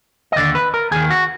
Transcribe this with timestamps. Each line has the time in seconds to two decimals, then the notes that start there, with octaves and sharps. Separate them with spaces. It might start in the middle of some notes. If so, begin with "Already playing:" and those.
0.32 D#5
0.36 D#2 D3 D5
0.55 B4
0.74 A#4
0.91 D#2 D#3 G#4
1.10 F#4